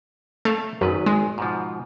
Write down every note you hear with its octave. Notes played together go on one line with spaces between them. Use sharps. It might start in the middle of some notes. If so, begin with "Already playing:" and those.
A3 C#5 F5
G#1 F#2 D#3 B4
G#3
G#2 B2 F3